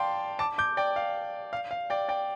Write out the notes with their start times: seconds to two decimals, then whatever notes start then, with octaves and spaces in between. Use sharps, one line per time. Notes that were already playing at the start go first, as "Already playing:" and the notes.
Already playing: D5 F5 G5 A5 C6
0.39 A5 D6
0.58 D6 G6
0.77 D5 G5
0.96 F5
1.53 F5
1.71 F5
1.90 D5 G5
2.09 D5 G5